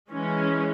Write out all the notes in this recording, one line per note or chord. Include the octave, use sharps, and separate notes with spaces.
E3 G#3 C#4